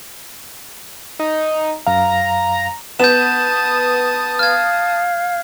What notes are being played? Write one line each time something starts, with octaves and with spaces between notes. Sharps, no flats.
D#4
F#2 F5 A#5
B3 A5 D#6 G6 E7
F5 F6 G#6